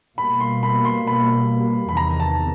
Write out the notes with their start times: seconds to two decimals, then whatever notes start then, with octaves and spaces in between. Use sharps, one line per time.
0.18 B2 G3 A#3 B5
0.40 C6
0.63 B5
0.85 C6
1.07 B5
1.89 B5
1.97 E2 C3 D#3 A#5
2.20 A5